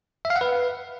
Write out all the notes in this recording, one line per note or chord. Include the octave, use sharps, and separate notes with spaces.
E5
F5
F#5
B4